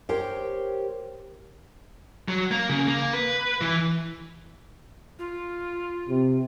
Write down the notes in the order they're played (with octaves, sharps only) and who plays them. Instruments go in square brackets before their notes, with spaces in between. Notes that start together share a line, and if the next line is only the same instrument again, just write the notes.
[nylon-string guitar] G4 A#4 C5 C#5 G5
[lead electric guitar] F#3
A#3
C#3
A#3
B4
E3
[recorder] F4
[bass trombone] C3